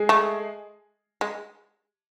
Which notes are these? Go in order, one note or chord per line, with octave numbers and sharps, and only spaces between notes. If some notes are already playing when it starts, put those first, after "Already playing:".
Already playing: G#3 G#4
A3
G#3